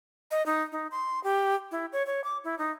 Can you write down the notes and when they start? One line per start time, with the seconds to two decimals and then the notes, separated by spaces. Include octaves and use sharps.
0.31 D#5
0.46 D#4
0.72 D#4
0.91 C6
1.24 G4
1.71 E4
1.93 C#5
2.06 C#5
2.24 D6
2.44 E4
2.58 D#4